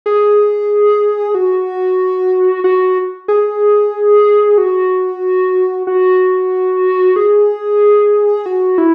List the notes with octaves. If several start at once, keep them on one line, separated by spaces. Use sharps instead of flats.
G#4
F#4
F#4
G#4
F#4
F#4
G#4
F#4
E4